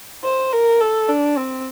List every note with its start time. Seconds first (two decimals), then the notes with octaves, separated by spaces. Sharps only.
0.24 C5
0.53 A#4
0.81 A4
1.09 D4
1.37 C4